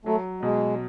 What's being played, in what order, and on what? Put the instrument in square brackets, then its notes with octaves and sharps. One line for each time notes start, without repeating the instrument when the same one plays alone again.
[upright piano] F#3 [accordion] A3
[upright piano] B2 [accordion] G#3